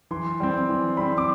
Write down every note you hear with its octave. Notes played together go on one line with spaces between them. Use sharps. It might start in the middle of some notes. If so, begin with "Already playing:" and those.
E3 C6
G3 C4
E3
G3 C4 B5
D6